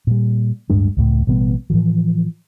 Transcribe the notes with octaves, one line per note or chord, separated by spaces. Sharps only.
A#2 G3
D1 G2 G#3 D4
C#2 A2
A1 B2 G3 B3
A2 E3 F3